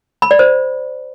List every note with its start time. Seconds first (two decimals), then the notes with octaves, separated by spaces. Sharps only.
0.22 B5
0.31 D5
0.39 C5